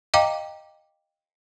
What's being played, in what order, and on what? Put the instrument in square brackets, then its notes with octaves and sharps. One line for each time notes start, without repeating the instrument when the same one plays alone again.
[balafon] D#5 F5 G5 A#5 D6